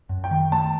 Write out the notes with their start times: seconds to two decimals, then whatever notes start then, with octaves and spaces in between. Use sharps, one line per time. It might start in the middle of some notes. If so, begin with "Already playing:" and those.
0.09 F#2
0.24 G5
0.31 D#3
0.52 A3 A5